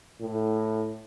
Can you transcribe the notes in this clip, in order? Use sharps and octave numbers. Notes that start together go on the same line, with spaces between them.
A2